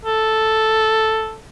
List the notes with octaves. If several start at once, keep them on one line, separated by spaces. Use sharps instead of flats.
A4